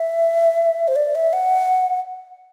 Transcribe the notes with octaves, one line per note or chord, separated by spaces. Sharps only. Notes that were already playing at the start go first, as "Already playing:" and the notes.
Already playing: E5
C5
D5
E5
F#5